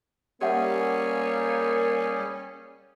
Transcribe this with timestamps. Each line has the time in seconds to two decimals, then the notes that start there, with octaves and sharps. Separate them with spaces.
0.41 G3 A#3 C#4 G4 G#4 E5 F#5